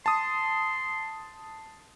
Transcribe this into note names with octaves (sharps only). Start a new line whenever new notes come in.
A5 C6 D#6